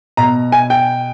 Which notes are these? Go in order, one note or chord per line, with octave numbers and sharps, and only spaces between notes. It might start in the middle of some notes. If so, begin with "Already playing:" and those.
B2 A#5
G#5
G5